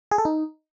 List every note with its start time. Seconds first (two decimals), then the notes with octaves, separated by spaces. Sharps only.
0.11 G#4
0.18 A4
0.25 D#4